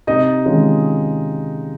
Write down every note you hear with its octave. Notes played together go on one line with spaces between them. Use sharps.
C3 D#4 D#5
D#3 G#3 C#4 F4